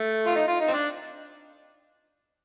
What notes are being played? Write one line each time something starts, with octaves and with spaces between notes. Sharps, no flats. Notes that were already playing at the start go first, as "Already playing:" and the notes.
Already playing: A3
F4
D#4
F4
D#4
C4
D4